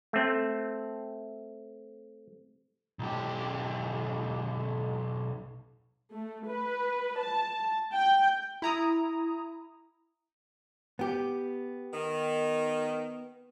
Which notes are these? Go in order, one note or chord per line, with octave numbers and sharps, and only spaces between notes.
A3 C4
B1 G4
A3
B4
A5
G5
E4 A#5 D#6
B3 G4
D#3